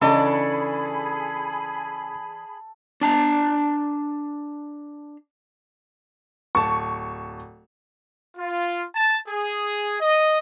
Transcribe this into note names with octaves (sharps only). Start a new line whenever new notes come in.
C#3 E3 D4 G#4 A4 D#5 B5
D4 A5 A#5
D1 A5 C#6
F4
A5
G#4
D#5